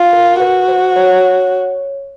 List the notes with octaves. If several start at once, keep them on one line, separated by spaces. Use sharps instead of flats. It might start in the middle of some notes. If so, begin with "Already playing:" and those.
Already playing: F4
A#4
F#4 B4
C5
C#5